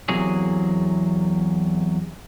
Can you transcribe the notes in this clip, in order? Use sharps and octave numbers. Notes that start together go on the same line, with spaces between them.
E2 C3 F#3 A#3 G#4